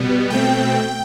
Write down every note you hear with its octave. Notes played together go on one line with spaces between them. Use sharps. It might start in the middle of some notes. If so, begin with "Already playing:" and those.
Already playing: B2 G3 B3
B2 A3 C4 G5